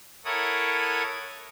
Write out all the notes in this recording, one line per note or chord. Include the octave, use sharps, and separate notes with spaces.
E4 A4 A#4 C#5 F#5 D#6